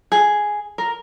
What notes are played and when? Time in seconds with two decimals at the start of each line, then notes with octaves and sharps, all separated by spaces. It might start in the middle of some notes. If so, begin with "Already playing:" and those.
0.12 G#4
0.78 A#4